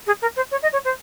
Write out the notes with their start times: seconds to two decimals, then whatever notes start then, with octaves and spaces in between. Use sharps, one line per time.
0.06 G#4
0.21 A#4
0.36 C5
0.51 C#5
0.62 D#5
0.72 C#5
0.84 C5